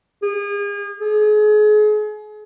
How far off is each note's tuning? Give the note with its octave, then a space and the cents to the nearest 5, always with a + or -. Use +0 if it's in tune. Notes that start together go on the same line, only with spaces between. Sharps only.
G#4 -35
G#4 +35